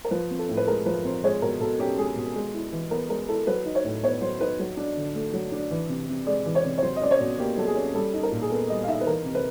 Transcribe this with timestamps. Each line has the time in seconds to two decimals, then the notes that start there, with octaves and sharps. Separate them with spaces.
0.05 A#4
0.11 F3 B4
0.31 C4
0.39 A4
0.49 A2
0.57 B4
0.67 G#3 A#4
0.86 F3 B4
1.05 C4 C5
1.24 G#3 C#5
1.42 B2 A#4
1.60 B2 A4
1.79 C#4 G4
1.98 G#3 G#4
2.16 B2
2.36 G#3
2.54 E4
2.73 E3
2.91 B3 A#4
3.09 G#3 A#4
3.28 E4 A4
3.47 F#3 B4
3.66 D#4
3.75 C#5
3.84 A2
4.03 B3 C#5
4.21 F#3 C5
4.40 D#4 B4
4.60 F#3
4.77 D4
4.96 D3
5.15 A3
5.33 F#3
5.52 D4
5.71 E3
5.89 C3
6.09 C3
6.27 G#3 D5
6.46 E3
6.55 C#5
6.65 C3
6.78 C#5
6.82 F#3 C5
6.96 D#5
7.02 C#4 D5
7.11 C#5
7.20 B2
7.38 A#3 G4
7.57 F#3 A4
7.67 G#4
7.75 C#4
7.94 G3 A4
8.14 D#4
8.23 A#4
8.32 A#2
8.42 G#4
8.50 B3 A4
8.69 G3 D#5
8.84 F5
8.88 D#4 E5
9.01 B4
9.07 E3 A#4
9.25 C3
9.35 B4